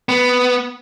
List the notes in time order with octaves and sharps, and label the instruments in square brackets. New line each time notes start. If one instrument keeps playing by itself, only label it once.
[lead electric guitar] B3